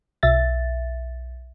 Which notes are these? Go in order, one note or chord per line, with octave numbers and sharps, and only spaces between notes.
B1 E5 A6